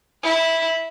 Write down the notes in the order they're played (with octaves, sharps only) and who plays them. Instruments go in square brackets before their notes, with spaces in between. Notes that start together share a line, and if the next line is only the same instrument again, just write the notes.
[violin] E4